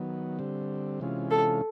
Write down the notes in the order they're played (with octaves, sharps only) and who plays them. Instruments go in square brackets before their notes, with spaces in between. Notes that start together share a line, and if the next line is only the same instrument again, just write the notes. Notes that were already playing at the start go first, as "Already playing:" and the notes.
Already playing: [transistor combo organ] D#3 F#3 B3
D3 G3 C4
C3 E3 G#3 C#4 F4
[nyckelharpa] A4